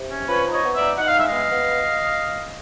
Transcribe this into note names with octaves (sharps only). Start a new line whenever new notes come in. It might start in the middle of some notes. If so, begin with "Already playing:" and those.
Already playing: C3
C#4
F3 B4 C#5
D#4
C#5 D#5
B3
D5 E5
D#4
D#4 F#5
F5
G#3 E5
D#5 F5
B3
B3